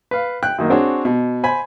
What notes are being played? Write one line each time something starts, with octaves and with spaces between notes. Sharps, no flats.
B4 F5
G5 F#6
F#2 D#3 A#3
C4 D4 F#4 G#4 C#5
B2
C5 G#5 B5